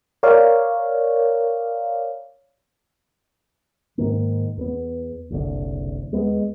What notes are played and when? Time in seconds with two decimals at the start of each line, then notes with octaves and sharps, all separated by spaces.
0.23 A#4 C#5 D5 F5
3.98 G#2 D#3 A#3
4.57 E2 A3 B3
5.30 F#1 C2 D3
6.12 D#2 G#3 B3